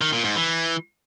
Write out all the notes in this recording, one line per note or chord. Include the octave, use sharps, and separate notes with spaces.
D#3
A#2
G#2
E3